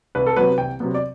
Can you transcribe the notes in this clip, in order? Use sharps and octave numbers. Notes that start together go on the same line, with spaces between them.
C2 B4
A4
C3 F#3 B3 B4
C2 G5
C3 F#3 B3
D5